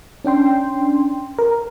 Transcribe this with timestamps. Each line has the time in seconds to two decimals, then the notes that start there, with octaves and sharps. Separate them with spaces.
0.24 C#4 D4 G5 C6
1.39 A#4